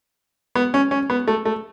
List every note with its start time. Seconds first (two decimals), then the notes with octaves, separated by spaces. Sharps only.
0.56 B3
0.74 C#4
0.91 C#4
1.10 B3
1.28 A3
1.45 A3